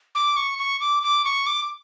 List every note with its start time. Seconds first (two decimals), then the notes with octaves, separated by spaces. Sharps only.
0.15 D6
0.37 C#6
0.59 C#6
0.81 D6
1.03 D6
1.25 C#6
1.46 D6